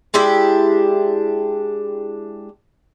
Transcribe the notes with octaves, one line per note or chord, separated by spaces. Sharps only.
G#3 D4 E4 G4